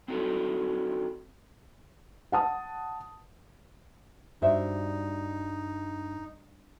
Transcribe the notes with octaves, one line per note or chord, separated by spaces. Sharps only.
C4 D4 D#4 F#4 A4
F#5 A5 D#6
G2 D#4 F#4 C5 E5